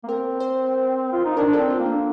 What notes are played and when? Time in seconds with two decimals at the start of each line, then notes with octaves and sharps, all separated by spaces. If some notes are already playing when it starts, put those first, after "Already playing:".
0.04 A#3
0.08 C4 A#4
0.40 C5
1.12 F4
1.25 D#4
1.37 D4 A#4
1.53 A4
1.58 C4
1.70 F4
1.80 A#3
1.86 D4